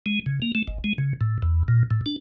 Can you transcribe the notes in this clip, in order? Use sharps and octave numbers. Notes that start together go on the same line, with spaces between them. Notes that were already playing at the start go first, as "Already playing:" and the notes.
G#3
C#3
A#3
A3
G#1
G#3
C#3
A2
E2
A#2
A2
D4